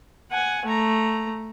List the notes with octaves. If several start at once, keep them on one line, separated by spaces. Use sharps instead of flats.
F#5 G#5
A3 A#5